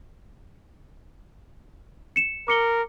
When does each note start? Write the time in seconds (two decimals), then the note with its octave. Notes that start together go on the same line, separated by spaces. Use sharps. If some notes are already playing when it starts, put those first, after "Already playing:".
2.16 C#7 E7
2.48 A#4 D6 C#7 G7